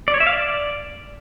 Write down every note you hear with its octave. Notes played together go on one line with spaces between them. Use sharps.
D5
C#5
E5
F5
D5